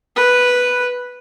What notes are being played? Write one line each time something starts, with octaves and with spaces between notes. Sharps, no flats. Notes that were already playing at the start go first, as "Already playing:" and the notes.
B4